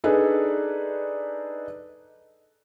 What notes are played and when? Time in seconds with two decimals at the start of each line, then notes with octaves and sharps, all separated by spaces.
0.04 D4 D#4 G#4 A4 B4 D5